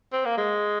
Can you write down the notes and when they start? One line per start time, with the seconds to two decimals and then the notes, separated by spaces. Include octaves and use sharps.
0.12 C4
0.25 A#3
0.38 G#3